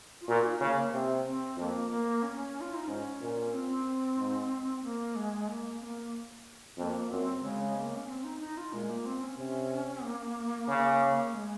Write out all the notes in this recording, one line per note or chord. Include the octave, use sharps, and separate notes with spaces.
F4
A#2 F#4
D#4
C#3 A#3
A#3
C3
C4
F2 A#3 C4
A#3
C#4
F4
D#4
G#2 C#4
A#2
C#4
C4
G#2
A#3
G#3
A#3
C4
A#3
F2 A#3 C4
F#2 C4
C#3 G#3
C4
A#3
C#4
C4
D#4
D#4
F4
A#2 G#3
A#3
C4
C#4
C3
A#3
C#3
G#3